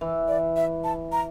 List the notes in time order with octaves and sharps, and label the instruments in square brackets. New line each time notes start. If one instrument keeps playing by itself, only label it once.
[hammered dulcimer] E3
[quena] D5
E5
A5
A#5